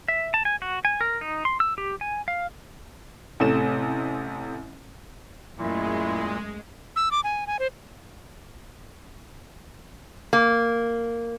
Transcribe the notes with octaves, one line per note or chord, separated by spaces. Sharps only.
E5
A5
G#5
F#4
G#5
A#4
D#4
C6
E6
G4
G#5
F5
A1 C3 A3 E7
F#2 A#2 G#3 A3 E4
E6
D6
G#5
G#5
C5
A#3